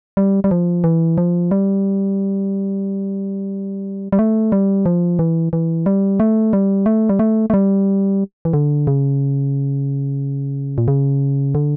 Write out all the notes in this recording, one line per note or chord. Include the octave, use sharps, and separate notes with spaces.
G3
G3
F3
E3
F3
G3
G3
A3
G3
F3
E3
E3
G3
A3
G3
A3
G3
A3
A3
G3
E3
D3
C#3
A#2
C#3
D3